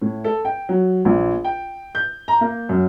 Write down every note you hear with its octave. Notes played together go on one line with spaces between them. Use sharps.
A2
A4
G5
F#3
A#1
G5
G6
A#5
A#3
F#2